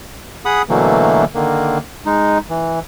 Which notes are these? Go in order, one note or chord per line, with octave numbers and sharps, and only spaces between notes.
G#4 F#5 B5 D#6
B2 D3 E3 F#3 A3 A#3
D3 D#3 A#3
G#3 D#4
E3